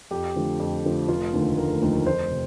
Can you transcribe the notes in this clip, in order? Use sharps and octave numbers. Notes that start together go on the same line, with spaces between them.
F2 G4
D3 F3 A3
F2
D3 F3 A3
F1 F4
D#2 D3 F3 A3
F1 A#4
D#2 D3 F3 A3
F2 C5
C3